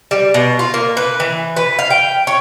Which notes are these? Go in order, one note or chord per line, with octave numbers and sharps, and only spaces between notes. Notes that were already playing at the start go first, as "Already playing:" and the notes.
G3
B2
F4
A#3
B4
E3
B4
F5
G5
C#5